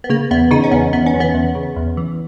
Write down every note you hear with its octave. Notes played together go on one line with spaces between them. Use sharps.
B3
C#3 A#3
E2 B3
C#3 D#4
C#4
E2 B3
E2 B3
C#4
E2
B3
E2
C#3
E2
E3